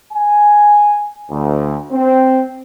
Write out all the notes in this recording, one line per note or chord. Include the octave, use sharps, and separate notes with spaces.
G#5
D2
C4